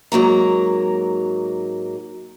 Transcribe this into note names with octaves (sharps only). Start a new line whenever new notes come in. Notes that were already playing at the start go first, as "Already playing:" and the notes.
G#2 F#3 A#3 A#5